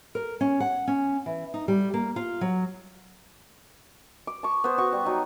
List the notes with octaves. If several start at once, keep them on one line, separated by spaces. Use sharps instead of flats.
A#4
C#4
F#5
C#4
E3
D#4
G3
A#3
F4
F#3
D6
A5 C#6
B3 C5
F#4 C#6
G3
F#3 D#4